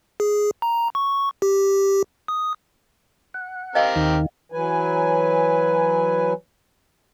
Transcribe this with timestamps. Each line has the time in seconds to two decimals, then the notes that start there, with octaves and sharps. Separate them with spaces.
0.20 G#4
0.62 A#5
0.95 C#6
1.42 G4
2.28 D#6
3.34 F#5
3.75 C4 G4 A#4 D#5 F5 G5
3.96 D#2 D#3
4.52 E3 F#3 B4 G#5